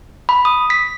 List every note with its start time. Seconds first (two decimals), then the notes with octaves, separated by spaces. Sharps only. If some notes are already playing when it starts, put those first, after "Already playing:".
0.29 B5
0.45 D#6
0.70 B6